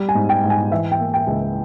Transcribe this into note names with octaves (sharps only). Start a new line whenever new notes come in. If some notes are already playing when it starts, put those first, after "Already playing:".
Already playing: G3
G#5
G#2
G5
G#2
G#5
E3 E5
G5
A#3
G5
C#2